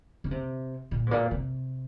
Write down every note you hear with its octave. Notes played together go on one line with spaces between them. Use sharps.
C#3
C3
A#2
G#2
A#2
C3